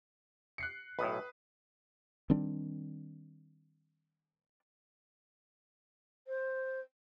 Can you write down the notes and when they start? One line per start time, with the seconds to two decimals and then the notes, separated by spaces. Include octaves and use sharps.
0.58 F#6 C7 C#7
0.99 B1 A2 B4 D#6
2.30 D#3 G3 C4 D4
6.27 C5